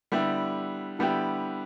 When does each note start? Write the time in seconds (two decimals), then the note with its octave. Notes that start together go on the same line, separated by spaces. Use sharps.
0.12 D3 G3 B3 E4 G4
0.99 D3 G3 B3 E4 G4